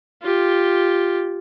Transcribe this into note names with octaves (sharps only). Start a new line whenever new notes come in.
F4 G4